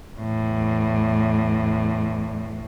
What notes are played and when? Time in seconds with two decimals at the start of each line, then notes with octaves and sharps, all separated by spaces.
0.20 E2 A2